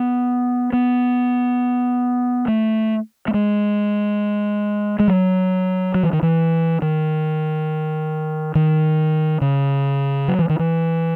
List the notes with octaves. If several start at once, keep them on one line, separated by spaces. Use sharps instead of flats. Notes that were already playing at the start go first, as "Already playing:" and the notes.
Already playing: B3
B3
A3
A3
G#3
G#3
F#3
F#3
E3
D#3
E3
D#3
D#3
C#3
F#3
E3
D#3
E3